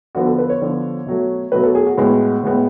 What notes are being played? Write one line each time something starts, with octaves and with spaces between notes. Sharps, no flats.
D3 F3 B3 F#4
A4
B4
C#5
D3 F3 B3
B2 F#3 A3
B2 F#3 A3 B4
A4
G#4
F#4
A2 G#3 B3
A2 G#3 B3